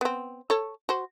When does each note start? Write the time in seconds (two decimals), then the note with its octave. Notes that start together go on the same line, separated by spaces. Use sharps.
0.01 B3 C4
0.50 A4 C#5
0.89 F#4 C5